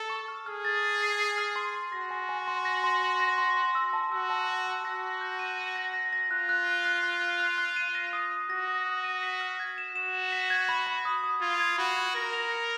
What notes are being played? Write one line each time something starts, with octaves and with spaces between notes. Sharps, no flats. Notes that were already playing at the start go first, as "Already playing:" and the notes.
Already playing: A4 A5
C#6
F6
G#4 F6
A6
A6
C7
C7
F6
C6
C6
F#4 A#6
G#5
G#5
C6
A#6
C6
C6
A#6
C6
C6
E6
A5
F#4 E6
A5
E6
A5
F#4 A#6
A#6
G6
D#7
D#7
A#6
A#6
A#6
F4 F#6
F#6
F#6
F#6
F#6
F#6
F#6
F#6
D#7
A#6
D#6
D#6
F#4 A#6
D#6
D#6
D#7
B6
F6
G#6
E7
F#4 E7
E7
B6
G#6
B5
B5
D#6
D#6
F4 G#6
G#6
F#4 B5
G#6
A#4 A#6
F7
C#7